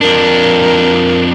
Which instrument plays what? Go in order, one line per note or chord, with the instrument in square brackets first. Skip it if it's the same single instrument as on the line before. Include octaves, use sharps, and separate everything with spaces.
[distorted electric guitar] F2 D4 [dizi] A#4